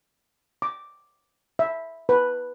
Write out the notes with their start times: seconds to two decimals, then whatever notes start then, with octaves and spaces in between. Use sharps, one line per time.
0.62 D6
1.59 E5
2.09 B4